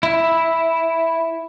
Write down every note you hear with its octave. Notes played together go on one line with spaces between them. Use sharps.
E4